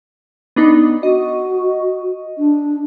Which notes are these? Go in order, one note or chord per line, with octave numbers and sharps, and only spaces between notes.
B3 D4 D#4
F#4 D#5
D4